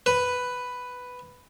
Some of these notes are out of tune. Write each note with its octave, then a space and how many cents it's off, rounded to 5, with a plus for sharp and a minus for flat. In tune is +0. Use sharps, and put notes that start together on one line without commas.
B4 +5